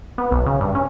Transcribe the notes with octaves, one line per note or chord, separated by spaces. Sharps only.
B3
B1
C#3
G2
C#4